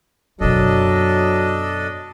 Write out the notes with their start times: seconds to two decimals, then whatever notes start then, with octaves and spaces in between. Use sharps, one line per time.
0.41 F#2 B2 F#3 D4 A4 D#5